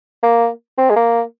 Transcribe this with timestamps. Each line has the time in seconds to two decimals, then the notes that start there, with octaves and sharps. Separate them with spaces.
0.23 A#3
0.78 C4
0.90 G#3
0.96 A#3